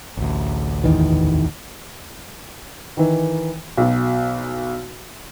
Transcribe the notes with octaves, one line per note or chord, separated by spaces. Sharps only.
A1 D2
E2 D#3 E3
D#3 E3
B1 B2